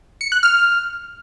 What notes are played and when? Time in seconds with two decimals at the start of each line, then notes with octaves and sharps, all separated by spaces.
0.21 C#7
0.32 F#6
0.43 F6